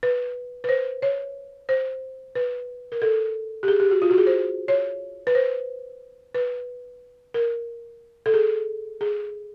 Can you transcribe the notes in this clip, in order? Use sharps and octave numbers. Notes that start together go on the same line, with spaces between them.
B4
B4
C5
C#5
C5
B4
A#4
A4
G4
G#4
G4
F#4
F4
F#4
G#4
C5
C#5
B4
C5
B4
A#4
A4
G#4
G#4